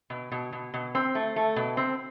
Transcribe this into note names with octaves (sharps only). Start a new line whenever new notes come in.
B2
B2
B2
B2
C4
A3
A3
B2
C4